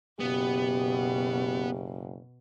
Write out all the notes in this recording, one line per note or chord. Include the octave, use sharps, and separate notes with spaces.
F#1 B2 B3 G4